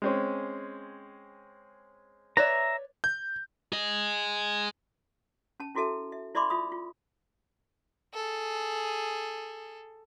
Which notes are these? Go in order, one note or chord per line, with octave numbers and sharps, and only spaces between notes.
G#3 C4 C#4
B4 C#5 D5 E5 A#5
G6
G#4 D#5
C#4 A5
C#4 E4 F#4 A4 E5 A5
E5
E4 D5 E5 B5 C6 D6
F4 E5 B5 D#6
F4
G#4 A4